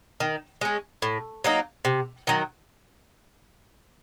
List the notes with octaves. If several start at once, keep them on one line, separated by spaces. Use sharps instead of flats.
D#3
G#3 C#4
A2
F#3 A#3 D#4
C3
D#3 F#3